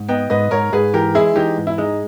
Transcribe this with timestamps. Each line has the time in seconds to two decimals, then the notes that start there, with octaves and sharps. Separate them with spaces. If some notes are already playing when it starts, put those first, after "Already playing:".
Already playing: G#2
0.09 B3 D#5 G5
0.30 G#2 B4 D#5
0.51 G#2 A#4 C#5
0.73 G#2 G#4 B4
0.94 E3 G4 A#4
1.15 G#3 E4 G#4
1.36 E3 D#4 G4
1.58 G#2
1.67 E4
1.78 G#3 D#4